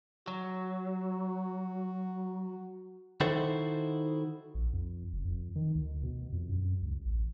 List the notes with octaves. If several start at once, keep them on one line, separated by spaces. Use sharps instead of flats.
F#3 F#4
D#3 D#4 E4 F#4 A4 C5
A#1
F2
F#1
F2
D#3
D2
B2
F2
F#2
C#2
A1